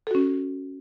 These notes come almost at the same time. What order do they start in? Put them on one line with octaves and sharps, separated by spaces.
A4 F#4 C#4